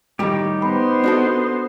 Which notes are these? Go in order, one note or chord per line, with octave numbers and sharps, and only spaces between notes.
A2 D#3 G3 D#4 G4
B3 C5 B5
D4 F#4 A4